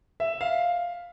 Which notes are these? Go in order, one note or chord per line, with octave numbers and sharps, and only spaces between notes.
E5
F5